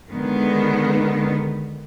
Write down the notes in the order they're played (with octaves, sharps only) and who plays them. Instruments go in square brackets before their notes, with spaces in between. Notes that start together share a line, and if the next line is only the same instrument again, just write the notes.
[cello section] D3 D#3 G#3 B3